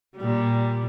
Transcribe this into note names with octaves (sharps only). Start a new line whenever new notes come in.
A#2 G3